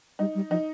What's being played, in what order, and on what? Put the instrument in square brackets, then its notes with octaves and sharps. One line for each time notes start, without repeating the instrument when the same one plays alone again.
[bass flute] G3 [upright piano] D#4
[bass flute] G3
[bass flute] F3 [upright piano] D#4